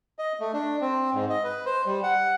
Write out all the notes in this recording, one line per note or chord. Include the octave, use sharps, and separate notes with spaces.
D#5
A3
D4
C4
G#2
D#5
B4
C5
G3
F#5